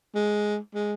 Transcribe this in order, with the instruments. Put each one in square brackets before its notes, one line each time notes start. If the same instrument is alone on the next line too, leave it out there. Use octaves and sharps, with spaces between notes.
[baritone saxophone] G#3
G#3